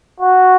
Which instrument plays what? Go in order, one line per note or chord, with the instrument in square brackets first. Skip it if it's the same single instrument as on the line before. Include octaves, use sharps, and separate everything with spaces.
[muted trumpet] F#4